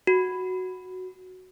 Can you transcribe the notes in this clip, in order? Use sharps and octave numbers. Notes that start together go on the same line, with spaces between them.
F#4